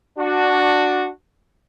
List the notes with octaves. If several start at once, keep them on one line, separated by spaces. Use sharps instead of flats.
D4 F#4